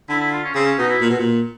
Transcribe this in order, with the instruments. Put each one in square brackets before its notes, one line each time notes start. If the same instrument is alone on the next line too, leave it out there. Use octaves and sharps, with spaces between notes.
[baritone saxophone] D3 [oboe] E4
[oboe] E4
F4
C#4
[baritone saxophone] C#3 [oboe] C4
[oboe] C#4
[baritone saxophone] B2 [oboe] D#4
[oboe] E4
[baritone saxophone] A#2
B2
A#2